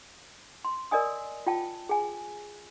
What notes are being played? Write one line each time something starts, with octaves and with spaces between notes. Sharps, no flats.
C6
A#4 D5 D#5 G#5 D#6
F4 G5 A5
G#4 G#5